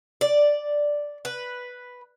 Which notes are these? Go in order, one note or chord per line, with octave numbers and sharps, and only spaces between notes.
D5
B4